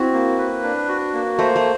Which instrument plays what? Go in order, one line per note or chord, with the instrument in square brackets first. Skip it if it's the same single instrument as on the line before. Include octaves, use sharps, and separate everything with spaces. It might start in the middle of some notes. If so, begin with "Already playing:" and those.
Already playing: [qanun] C4 E4 [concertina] F#4
[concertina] A#3
B4
D4
F#4
A#3
[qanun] A3 [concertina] C5
[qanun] A3